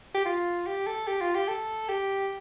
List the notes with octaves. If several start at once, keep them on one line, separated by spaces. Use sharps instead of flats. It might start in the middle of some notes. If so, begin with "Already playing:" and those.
G4
F4
G4
A4
G4
F4
G4
A4
G4